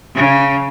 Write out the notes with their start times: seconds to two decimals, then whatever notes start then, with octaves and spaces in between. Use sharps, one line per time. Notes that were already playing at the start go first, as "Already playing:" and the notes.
0.15 C#3